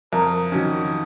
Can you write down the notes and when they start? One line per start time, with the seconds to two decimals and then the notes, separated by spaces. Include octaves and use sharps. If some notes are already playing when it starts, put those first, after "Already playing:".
0.13 F2 A#4
0.52 D#3 F#3 C#4